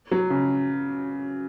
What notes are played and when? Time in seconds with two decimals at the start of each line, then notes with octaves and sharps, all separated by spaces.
0.11 F#3
0.30 C#3